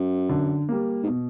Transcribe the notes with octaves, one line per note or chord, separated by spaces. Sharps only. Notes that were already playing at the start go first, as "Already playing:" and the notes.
Already playing: F#2
D3
G3 A#3
G#2
B2